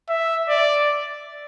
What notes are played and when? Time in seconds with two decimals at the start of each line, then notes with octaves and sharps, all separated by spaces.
0.09 E5
0.49 D5